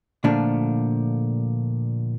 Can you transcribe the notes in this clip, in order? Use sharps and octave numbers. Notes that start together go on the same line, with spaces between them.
A#2 D3 F3 A3 D4 F4